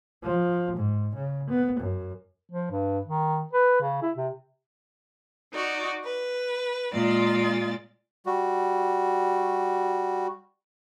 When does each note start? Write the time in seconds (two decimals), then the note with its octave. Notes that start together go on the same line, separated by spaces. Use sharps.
0.23 F3
0.76 G#2
1.15 C#3
1.50 B3
1.80 F#2
2.52 F3
2.71 G2
3.07 D#3
3.53 B4
3.81 C#3
4.02 E4
4.17 C3
5.53 D#4 F#4 D5
6.05 B4
6.92 A#2 G#3 F4 D5 A6
8.26 G3 F#4